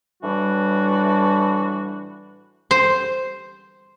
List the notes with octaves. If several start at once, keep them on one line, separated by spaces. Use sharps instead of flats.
A2 E3 G3 D4 F#4
C5